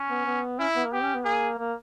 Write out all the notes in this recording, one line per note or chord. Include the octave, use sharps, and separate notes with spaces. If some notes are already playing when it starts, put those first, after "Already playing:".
Already playing: C#4
B3
B3
C#4 E4
B3
A#3
B3 G4
C#4
B3
A#3 G#4
A#3